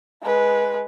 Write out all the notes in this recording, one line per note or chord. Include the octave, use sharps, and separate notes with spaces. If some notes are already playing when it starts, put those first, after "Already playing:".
G#3 B4